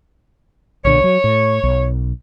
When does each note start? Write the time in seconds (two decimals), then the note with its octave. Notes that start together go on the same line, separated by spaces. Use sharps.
0.85 B1 A#2 D3 C#5
1.04 F#3
1.24 A2
1.63 B1